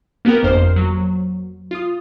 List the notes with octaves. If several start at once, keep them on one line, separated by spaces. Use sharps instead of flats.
A#3 B3 G4 A#4
G1 F2 C5 F6 C7
F#3
F4 D#6